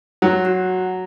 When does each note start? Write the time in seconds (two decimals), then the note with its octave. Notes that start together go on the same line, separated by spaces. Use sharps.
0.22 F#3 F#4 F#5
0.45 F#4 F#5